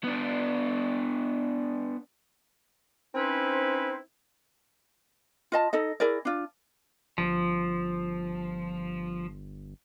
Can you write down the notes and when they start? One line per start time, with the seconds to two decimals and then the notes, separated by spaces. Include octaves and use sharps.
0.04 B3 D4
3.15 C4 C#4 D#4 E4 B4 C5
5.52 F4 D#5 A5
5.73 D#4 A4 D#5
6.00 E4 G#4 A#4 D5
6.25 D4 F4
7.18 G1 F3